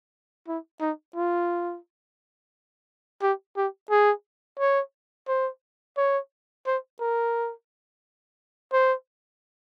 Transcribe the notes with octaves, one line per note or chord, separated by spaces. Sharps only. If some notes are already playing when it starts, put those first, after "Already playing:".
E4
D#4
F4
G4
G4
G#4
C#5
C5
C#5
C5
A#4
C5